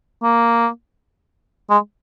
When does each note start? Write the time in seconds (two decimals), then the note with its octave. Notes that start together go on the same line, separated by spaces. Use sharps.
0.23 A#3
1.70 G#3